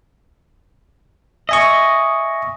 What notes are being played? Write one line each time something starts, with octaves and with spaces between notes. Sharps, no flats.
D#5 E5 G#5 C#6